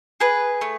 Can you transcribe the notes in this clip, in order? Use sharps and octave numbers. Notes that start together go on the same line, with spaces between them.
G#4 B4
A3